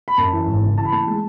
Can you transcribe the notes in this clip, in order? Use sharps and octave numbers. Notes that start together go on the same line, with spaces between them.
B5
F#2 A5
E3
G#1
C#3
E3 A5
B5
A3 A5
G#3